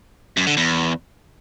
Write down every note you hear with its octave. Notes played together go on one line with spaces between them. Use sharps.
F#2
D3
E2